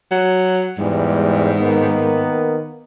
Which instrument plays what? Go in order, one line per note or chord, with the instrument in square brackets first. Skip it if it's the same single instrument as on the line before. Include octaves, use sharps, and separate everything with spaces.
[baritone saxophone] F#3
[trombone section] E2 G3 G#3 [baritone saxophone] G#2
[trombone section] D#3 A#3 B3